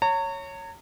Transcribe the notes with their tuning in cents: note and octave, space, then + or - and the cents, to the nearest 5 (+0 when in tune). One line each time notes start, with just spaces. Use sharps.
C#5 +0 A#5 -40